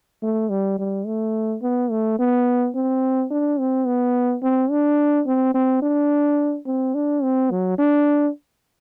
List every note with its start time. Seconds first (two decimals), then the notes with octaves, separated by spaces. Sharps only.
0.22 A3
0.50 G3
0.79 G3
1.06 A3
1.62 B3
1.90 A3
2.19 B3
2.75 C4
3.30 D4
3.59 C4
3.86 B3
4.43 C4
4.70 D4
5.26 C4
5.54 C4
5.82 D4
6.66 C4
6.94 D4
7.23 C4
7.51 F#3
7.78 D4